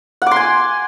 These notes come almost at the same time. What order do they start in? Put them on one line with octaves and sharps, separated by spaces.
F#5 D6 C6 G#5